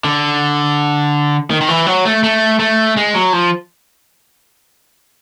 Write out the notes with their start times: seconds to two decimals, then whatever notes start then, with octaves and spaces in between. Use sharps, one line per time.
0.04 D3
1.51 D#3
1.61 D#3
1.69 E3
1.86 F#3
2.05 A3
2.24 A3
2.59 A3
2.97 G#3
3.14 F#3
3.33 F3